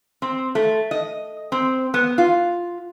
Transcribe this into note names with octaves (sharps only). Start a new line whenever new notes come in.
C4
A3
D#5
C4
B3
F4